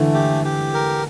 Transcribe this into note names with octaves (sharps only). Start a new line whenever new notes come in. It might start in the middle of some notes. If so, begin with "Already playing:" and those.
Already playing: D3 E3 A3
G4
G4
A#4